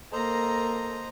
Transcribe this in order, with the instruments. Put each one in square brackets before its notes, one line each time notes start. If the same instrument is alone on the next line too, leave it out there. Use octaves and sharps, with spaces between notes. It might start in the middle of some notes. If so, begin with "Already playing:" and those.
[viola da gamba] A#3 [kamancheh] A4 A#4 [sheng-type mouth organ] C5 D#5 A#5